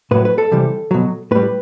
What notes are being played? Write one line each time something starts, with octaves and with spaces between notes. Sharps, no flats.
A2 F#3 B4
B4
A4
C3 E3 G3
B2 F#3
A2 G3 B4